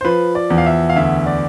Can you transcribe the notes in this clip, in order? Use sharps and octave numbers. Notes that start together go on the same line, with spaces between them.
C5
F3 B4
D5
E2
F5
E5
F5
D2 E5
D5